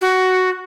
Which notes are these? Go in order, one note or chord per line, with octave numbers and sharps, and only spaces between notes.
F#4